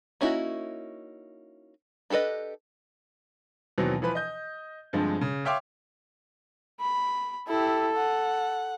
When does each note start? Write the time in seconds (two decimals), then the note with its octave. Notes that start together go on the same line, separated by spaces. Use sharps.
0.21 A#3 C#4 D#4 E4 F#4
2.10 D4 G4 A4 B4 D#5
3.78 D#2 B2 E3 F#3 C4
4.02 E3 F3 B4 B5
4.15 D#5 G6
4.93 G2 D3 F3 G#3 C4
5.21 C#3
5.45 C#5 E5 F5 G5 C6 D6
6.80 B5
7.48 E4 G4 A4
7.96 F#5